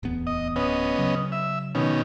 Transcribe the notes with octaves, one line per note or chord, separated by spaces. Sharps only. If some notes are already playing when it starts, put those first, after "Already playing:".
D1 E2 B3
D#5
D1 B3 C#4 D#5
C#3 F#3
E5
B2 D#3 C#4